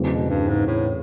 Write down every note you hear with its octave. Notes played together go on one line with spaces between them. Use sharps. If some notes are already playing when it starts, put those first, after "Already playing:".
Already playing: E2 C#3 F#3 A3 C4
B2
G2
G#2
A2